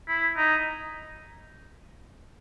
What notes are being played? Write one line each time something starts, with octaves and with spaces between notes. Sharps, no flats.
E4
D#4